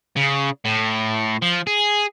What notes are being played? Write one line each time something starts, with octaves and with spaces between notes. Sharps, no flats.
C#3
A2
F3
G#4